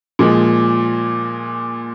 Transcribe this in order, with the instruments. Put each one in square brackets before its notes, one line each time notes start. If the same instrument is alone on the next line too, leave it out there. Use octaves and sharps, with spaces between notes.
[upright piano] A#2 F3 G#3